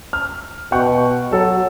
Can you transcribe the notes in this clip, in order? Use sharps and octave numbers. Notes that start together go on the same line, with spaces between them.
F6
B2 F#5 G5 C#6
F#3 A4